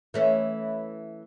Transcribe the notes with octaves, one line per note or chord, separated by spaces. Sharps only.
E3 A3 C#4